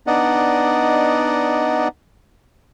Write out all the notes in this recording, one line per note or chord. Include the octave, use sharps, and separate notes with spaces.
B3 D4 D#4 D5 D#5 F#5